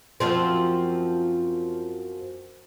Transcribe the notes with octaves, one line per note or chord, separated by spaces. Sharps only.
F#2 F3 C4